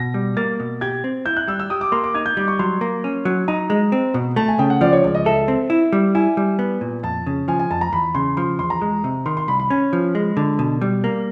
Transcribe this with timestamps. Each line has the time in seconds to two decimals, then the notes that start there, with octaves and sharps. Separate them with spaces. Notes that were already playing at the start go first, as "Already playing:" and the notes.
Already playing: B2 A#6
0.14 G3
0.37 A#3 A6
0.60 B2
0.81 G4 G#6
1.04 C4
1.25 E4 G6
1.37 F#6
1.48 G3 E6
1.59 E6
1.70 G4 D#6
1.81 D6
1.92 A#3 C6
2.04 D6
2.15 D#4 G#6
2.26 G6
2.37 G3 D6
2.48 C#6
2.59 F#3 C6
2.81 A#3
3.04 C#4
3.25 F#3
3.48 D#4 A#5
3.70 G#3
3.92 C4
4.14 B2
4.36 A3 A5
4.48 G#5
4.59 C#3 G5
4.70 F#5
4.81 F3 D5
4.93 C#5
5.03 C#2 D5
5.15 D#5
5.25 A4 E5
5.48 C4
5.70 E4
5.93 G3
6.15 E4 G#5
6.37 G3
6.59 B3
6.81 A#2
7.03 F2 A5
7.26 C#3
7.48 F3 G#5
7.59 G#5
7.70 F2 A5
7.81 A#5
7.93 E2 B5
8.15 C#3 C6
8.37 F3 C6
8.59 E2 C6
8.70 A#5
8.82 G#3
9.04 C3
9.26 D#3 C6
9.37 C6
9.48 C2 B5
9.60 B5
9.70 C#4
9.93 F3
10.15 G#3
10.37 D3
10.59 B2
10.81 G3
11.04 A#3